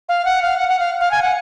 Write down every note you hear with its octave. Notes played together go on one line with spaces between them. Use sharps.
F5
F#5
F5
F#5
F#5
F5
F5
G#5
F#5